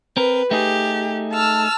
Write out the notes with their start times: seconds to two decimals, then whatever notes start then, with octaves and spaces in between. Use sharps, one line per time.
0.17 C4 A#4 B4
0.51 A3 D#4 G4 G#4
1.33 A5 E6 F6